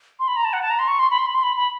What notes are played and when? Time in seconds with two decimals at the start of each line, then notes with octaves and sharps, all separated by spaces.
0.19 C6
0.28 B5
0.36 A#5
0.45 A5
0.53 F#5
0.62 A5
0.70 A#5
0.79 C6
0.88 C#6
0.99 C6
1.11 B5
1.18 C6
1.26 B5
1.34 C6
1.43 B5
1.56 B5